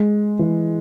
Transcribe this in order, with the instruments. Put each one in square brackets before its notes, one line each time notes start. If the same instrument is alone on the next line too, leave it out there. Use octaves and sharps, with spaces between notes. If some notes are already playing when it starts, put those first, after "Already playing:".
Already playing: [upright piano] G#3
E3